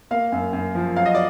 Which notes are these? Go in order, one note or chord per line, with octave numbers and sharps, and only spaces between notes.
A#3 F5
F#2
F#2
F3
F#3 F5
D#5
D5